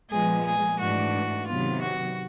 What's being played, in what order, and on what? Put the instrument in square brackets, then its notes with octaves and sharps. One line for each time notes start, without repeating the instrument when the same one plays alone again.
[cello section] A#2 F3 G#3 B3 [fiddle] G#4
[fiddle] G#4
[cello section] G#2 E3 A3 D4 [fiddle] F#4
[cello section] C3 D#3 F#3 B3 [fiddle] F4
[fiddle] F#4